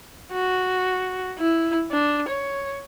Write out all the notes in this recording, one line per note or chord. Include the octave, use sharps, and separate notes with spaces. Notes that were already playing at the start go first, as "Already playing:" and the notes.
F#4
E4
D4
C#5